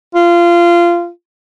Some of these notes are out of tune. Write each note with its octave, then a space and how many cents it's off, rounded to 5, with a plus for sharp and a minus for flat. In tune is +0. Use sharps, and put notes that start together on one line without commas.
F4 -20